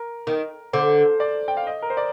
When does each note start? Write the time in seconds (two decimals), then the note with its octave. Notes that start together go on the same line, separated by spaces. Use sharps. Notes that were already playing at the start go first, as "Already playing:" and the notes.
Already playing: A#4
0.27 D#3
0.73 D3 C5
1.20 D5
1.48 G5
1.57 F5
1.67 D#5
1.82 A#4
1.90 C5
1.97 D5